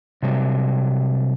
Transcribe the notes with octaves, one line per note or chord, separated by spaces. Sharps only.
C3 F#3 G3